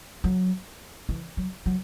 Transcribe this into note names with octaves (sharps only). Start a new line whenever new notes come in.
F#3
E3
F#3
F#3